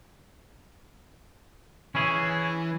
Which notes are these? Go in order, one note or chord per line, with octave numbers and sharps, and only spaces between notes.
E3 C#4 E4 G#4